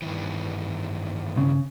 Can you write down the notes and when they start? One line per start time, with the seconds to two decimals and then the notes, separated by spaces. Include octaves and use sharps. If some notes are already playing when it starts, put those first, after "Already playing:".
0.02 G2 D#3 E3
1.37 C#3